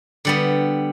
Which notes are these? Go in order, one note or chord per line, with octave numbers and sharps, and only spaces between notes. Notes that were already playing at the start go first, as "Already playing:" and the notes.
D3 G3 B3